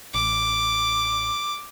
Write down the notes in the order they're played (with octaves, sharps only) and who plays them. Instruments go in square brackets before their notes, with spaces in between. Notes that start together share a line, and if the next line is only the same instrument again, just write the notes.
[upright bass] A1 [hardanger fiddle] D6